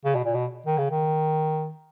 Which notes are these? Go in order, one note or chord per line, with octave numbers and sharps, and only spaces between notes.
C#3
B2
A#2
B2
D#3
C#3
D#3